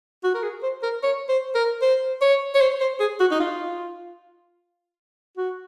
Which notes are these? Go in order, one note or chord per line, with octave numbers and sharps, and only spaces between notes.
F#4
A#4
G#4
C5
A#4
C#5
C5
A#4
C5
C#5
C#5
C5
C5
G#4
F#4
D#4
F4
F#4